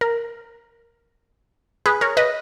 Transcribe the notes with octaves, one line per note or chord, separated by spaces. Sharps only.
A#4
G#4 B4
A#4 C#5
B4 D#5